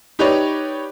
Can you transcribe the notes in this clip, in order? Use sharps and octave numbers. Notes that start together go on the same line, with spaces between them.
D#4 G4 B4 C#5 D5